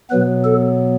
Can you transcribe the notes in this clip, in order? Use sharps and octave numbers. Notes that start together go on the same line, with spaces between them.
B2 F#3 B3 B4
A4